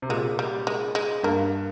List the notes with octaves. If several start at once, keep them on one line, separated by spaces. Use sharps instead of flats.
C3
A#2 G#3
G3
G#3
G#3
G2 A#3